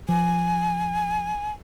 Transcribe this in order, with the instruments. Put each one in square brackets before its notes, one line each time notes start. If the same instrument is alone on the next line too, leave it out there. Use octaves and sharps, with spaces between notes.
[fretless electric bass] F3 [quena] G#5